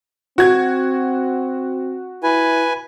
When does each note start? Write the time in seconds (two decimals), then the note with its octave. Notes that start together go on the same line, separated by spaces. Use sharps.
0.38 C4 F#4 G#6
2.23 E4 B4 G#5